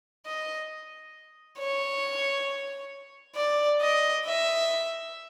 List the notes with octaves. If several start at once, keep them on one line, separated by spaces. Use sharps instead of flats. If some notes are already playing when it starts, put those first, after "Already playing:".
D#5
C#5
D5
D#5
E5